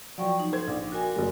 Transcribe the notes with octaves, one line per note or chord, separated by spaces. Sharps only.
F3 F#3 D5 G5 C#6
D#4
A4 C5 G#6
A#1
F#4 A#4 G#5
F#1 G3